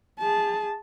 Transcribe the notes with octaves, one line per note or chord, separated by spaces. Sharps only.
G#4 A5